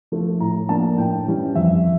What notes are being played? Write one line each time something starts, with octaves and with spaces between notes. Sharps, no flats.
F3 A3 E4
A2 A#5
F3 A#3 D4 A5
A2 G5
E3 G3 C#4 E4
F2 E5